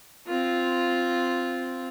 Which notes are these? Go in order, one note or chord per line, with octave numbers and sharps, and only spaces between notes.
C4 F4